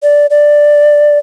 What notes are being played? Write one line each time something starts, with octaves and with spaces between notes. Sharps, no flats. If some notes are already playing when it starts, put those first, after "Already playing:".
D5
D5